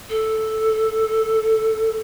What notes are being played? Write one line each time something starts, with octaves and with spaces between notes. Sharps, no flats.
A4